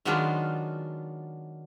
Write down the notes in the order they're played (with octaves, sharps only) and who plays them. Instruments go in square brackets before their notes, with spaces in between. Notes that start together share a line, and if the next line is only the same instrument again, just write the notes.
[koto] D#3 F#3 G#3 B3 D4 F4